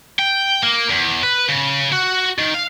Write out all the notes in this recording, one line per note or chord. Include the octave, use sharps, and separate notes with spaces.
G5
A#3
E2
B4
C#3
F#4
D#3
F5